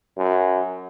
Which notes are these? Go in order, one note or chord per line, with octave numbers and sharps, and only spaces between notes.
F#2